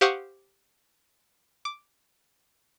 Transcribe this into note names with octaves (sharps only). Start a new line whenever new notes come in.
G4 C5 F5 F#5 C#6 D#6
D6